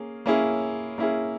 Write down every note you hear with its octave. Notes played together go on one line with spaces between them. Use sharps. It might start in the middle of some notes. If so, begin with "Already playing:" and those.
Already playing: A#3 C#4 G#4
A#3 C#4 E4 G#4
A#3 C#4 E4 G#4